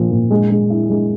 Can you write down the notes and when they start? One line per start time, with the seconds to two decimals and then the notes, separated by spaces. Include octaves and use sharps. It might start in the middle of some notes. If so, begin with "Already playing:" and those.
Already playing: A#2 F3 A#3
0.11 A#2
0.31 G#3
0.50 G#3
0.70 E4
0.90 G#3